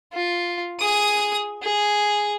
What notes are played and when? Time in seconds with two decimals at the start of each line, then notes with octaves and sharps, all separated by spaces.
0.13 F4
0.80 G#4 D#6
1.62 G#4